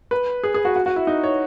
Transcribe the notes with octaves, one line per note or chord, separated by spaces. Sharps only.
B4
G#4
G#4
F#4
F#4
F#4
E4
D#4
C#5